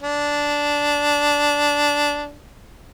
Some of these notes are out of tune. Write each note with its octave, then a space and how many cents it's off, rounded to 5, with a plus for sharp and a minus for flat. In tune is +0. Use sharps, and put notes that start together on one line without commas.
D4 -10